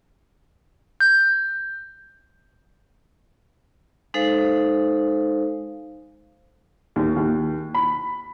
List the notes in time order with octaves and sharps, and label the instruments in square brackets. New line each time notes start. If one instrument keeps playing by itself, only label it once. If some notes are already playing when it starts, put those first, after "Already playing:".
[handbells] G6
[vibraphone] G#3 D#4 A4 C5 F5
[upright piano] D#2
D#2
B5